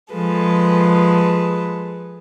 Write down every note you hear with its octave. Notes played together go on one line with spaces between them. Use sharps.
F3 G#3 A4 B4